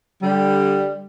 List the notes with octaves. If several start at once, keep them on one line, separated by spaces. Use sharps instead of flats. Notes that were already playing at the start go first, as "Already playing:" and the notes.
D3 G3